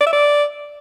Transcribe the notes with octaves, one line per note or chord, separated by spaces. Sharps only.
D5
E5
D5